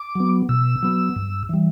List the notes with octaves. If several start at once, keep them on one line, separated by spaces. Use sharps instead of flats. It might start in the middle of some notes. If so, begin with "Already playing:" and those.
Already playing: D6
F#3 B3
B2 E6
F#3 B3
G2
E3 G3